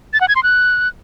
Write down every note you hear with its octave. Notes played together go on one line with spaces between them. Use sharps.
A6
F#5
G#6
C6
F#6